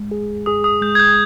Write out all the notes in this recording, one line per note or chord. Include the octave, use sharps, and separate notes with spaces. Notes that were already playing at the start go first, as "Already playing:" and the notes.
Already playing: G#3
G#4
G#4 D#6
D#6
G#3 G6
G#6
G6